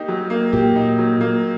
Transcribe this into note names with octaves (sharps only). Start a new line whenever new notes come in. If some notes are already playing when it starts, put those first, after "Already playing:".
Already playing: A#3 D#4 G4
F#3
A#3
A#2 G4
D#4
F#3
A#3